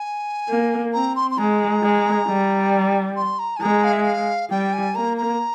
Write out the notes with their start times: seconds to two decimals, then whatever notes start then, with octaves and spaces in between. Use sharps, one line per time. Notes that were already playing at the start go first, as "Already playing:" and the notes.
Already playing: G#5
0.49 A#3
0.93 C4 A#5
1.16 C6
1.31 C6
1.38 G#3 A#5
1.83 G#3
2.27 G3
3.16 C6
3.39 A#5
3.56 G#5
3.61 G#3 A#5
3.84 F5
3.93 E5
4.02 F5
4.50 G3 G5
4.73 G#5
4.95 A#3 A#5
5.17 A#5